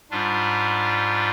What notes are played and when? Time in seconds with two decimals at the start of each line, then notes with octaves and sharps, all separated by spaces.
0.11 G#2 G3 D4 F4